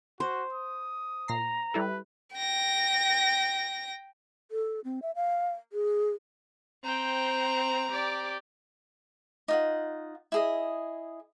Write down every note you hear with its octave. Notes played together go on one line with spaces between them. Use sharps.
F#4 C5
D#6
A#2 A#5 A#6 C7
G3 E4 A4 B4
G5 A#6
A4
C4
E5
F5
G#4
C4 C5 G5 A#5
G4 D5
D#4 F4 F#5
E4 G#4 D#5